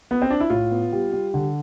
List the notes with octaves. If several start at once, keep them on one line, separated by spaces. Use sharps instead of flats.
B3
C4
D4
E4
A2 F4
B3
G3
G3
D3